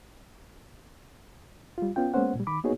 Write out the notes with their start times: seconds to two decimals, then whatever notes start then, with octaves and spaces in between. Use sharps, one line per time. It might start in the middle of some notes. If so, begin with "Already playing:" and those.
1.78 G3 F4
1.96 B3 C#4 F4 G5
2.14 G#3 A#3 B3 C#4 C5 F#5
2.35 A#2 G3
2.47 D#3 B5 D6
2.64 A#3 B3 D#4 F#4 G#4 C#5